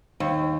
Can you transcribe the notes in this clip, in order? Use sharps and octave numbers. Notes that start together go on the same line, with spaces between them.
D#2